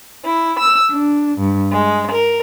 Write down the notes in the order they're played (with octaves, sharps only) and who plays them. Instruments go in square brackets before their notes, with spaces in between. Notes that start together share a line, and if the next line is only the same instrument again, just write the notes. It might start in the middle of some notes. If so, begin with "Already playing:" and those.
[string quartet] E4
E6
D4
G2
G#3
A#4